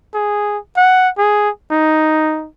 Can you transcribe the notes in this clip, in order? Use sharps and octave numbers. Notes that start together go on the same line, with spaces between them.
G#4
F#5
G#4
D#4